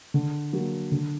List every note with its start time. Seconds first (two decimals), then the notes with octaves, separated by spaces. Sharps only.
0.14 D3
0.53 F#3 A#3
0.91 D3